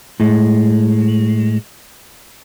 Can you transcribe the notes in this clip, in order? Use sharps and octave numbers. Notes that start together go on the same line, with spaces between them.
A2 G#3